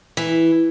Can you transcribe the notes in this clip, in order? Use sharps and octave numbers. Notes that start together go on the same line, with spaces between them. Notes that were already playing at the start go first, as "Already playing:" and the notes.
E3